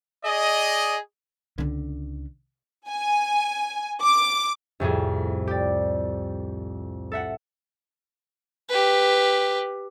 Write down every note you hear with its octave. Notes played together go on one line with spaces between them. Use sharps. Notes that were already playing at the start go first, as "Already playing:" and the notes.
G#4 D5 D#5
C#2 D3
G#5
D6
C2 F2 A2 G#4
G4 D5
A4 E5 F#5
G4 B4